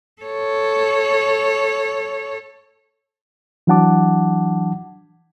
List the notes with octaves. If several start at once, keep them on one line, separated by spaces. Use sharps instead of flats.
A4 C#5
E3 F#3 D4 F#5 A5 D6